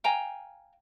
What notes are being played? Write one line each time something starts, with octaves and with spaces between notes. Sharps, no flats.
F5 G5 G#5 A#5